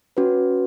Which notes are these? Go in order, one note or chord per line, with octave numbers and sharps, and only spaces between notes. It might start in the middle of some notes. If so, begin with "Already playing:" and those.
C#4 F#4 B4